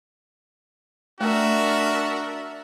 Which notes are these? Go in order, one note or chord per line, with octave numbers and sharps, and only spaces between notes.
A3 D4 F#4 A#4 E5